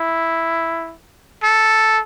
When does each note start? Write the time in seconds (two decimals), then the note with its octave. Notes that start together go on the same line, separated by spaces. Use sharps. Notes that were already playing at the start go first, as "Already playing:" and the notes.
Already playing: E4
1.43 A4